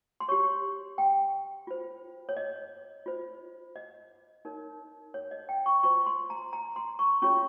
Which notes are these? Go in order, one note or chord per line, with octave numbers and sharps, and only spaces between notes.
C6
G4 C#5 C#6
G5
F4 C5
C#5
D#5
F4 C5
D#5
D#4 A#4 C#5
C#5
D#5
G5
C#6
F4 C5 C#6
C6
A#5
A#5
C6
C#6
C#4 F4 G#4 C#5 C#6